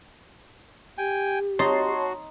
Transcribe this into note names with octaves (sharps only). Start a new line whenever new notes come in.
G4 G5 G#5
D#4 F#4 C#5 A5 C6